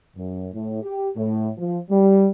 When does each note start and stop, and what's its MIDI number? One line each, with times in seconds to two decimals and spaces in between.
0.16 0.48 42
0.54 0.82 45
0.83 1.09 67
1.16 1.50 45
1.57 1.78 53
1.90 2.28 55